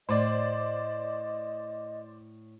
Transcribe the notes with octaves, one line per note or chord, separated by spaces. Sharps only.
A2 C5 D5 D#5